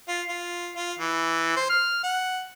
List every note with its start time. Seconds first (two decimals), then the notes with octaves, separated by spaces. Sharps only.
0.08 F4
0.29 F4
0.76 F4
0.99 E3
1.57 C5
1.70 F6
2.03 F#5